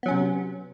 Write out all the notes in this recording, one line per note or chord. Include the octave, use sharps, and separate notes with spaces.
C3 F#3 B3 C#4